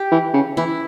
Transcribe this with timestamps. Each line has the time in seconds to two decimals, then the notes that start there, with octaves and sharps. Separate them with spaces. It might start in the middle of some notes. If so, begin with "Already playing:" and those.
Already playing: G4
0.11 E3
0.33 C#3
0.57 E3 E4